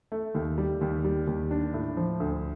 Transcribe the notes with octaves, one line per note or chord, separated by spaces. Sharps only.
A3
D#2
G3
D#2
G3
D#2
D4
A2
F3
D2